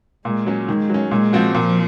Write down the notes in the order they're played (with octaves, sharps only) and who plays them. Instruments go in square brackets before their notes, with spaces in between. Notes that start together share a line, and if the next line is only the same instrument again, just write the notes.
[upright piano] A#2 [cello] G#3
[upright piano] F#3 C#4
[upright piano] D#3 [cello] G#3
[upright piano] F#3 C#4
[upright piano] A#2 [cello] G#3
[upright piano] F3 C4 F#4
[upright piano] A#2 [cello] F3